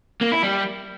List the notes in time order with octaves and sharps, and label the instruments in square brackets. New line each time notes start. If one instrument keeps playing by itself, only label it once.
[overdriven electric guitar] A#3
E4
G3